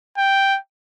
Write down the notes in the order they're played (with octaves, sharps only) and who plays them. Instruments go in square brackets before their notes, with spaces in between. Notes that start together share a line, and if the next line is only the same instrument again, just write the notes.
[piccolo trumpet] G5